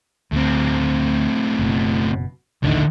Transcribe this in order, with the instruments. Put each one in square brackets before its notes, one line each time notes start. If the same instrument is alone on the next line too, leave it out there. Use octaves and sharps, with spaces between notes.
[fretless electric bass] D2 [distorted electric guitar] A2 C4
[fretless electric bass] F#1 B2
[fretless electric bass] A#1 D#2 A2 [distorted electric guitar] D3 D#4